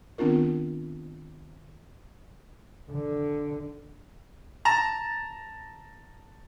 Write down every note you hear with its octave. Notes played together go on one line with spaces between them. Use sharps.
D#3 B3 C4 D4 F4 A#4
D3
A5 A#5